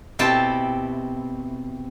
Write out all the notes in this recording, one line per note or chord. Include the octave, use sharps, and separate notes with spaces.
B2 C4 E4 G4 A5